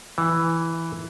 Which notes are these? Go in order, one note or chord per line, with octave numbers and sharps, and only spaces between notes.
E3